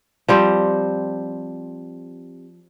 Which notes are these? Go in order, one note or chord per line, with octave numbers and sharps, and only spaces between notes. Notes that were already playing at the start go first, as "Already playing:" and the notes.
F3 G3 C4